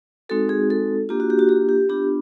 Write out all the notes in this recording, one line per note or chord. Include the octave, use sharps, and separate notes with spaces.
G#3 C4 D#4 F#4 A4
G#4
A4
A#3 D4 F4 G4
F#4
G4
F#4
G4
G4
B3 D4 F4 G4